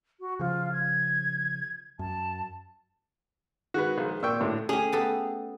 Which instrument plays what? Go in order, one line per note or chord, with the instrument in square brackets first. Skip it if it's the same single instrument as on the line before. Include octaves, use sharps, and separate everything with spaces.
[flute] F#4
[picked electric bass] C#3 F3 [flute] F4
[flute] G#6
[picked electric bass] F#2 [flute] A5
[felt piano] D#3 G#3 B4 [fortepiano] F#4
[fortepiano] A#1
[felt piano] A#2 [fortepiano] G5 C#6 E6
[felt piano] A2 [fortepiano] D3
[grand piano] A3 [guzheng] C#4 G4 [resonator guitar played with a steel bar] G#4
[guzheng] B3 G4 A4